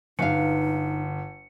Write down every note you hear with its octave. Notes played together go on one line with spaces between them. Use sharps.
G1 D#4 B4 E5 F5 C#7